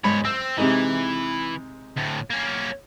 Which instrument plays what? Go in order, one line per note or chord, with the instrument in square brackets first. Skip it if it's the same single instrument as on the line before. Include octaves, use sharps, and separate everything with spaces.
[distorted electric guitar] E2 C#5 [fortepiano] G#2 B5
[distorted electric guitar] C4 [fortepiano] E6
[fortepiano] C3 G#3 D#4 [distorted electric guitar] E3
[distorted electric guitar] D2 A2
A#3 C#4